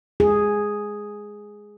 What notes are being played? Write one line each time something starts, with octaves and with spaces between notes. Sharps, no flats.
G#4